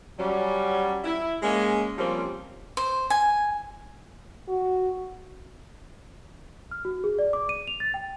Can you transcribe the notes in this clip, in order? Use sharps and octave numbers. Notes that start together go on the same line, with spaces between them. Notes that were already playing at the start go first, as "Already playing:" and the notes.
F#3 G3 C#4
E4
G#3 A#3 C#4
F3 G3 A#3 C4 C#4
C5
G#5
F#4
F6
F#4
G#4
D5
D6
D#7
F7
A6
G5